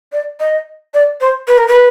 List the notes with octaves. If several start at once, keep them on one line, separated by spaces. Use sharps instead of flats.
D5
D#5
D5
C5
B4
A#4
B4